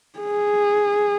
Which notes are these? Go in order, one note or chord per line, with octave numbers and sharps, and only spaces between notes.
G#4